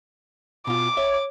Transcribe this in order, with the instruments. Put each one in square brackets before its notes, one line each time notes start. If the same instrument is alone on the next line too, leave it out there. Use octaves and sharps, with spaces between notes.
[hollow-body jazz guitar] B2 F4 [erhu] D6
[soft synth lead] C#5 [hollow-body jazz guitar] E5